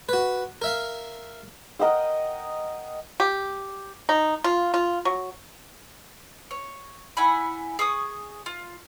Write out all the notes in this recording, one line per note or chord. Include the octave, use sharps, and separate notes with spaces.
F#4 B4
A#4 E5 F5
A#4 D#5 F#5 G5
G4
D#4
F4
F4
F#3
C#5
E4 F#5 G#5 B5
G#4 C#6 D#6
F4